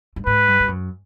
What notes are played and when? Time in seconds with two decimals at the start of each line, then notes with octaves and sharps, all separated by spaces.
0.16 G2
0.27 G#2 B4
0.48 G2
0.60 G2
0.68 F#2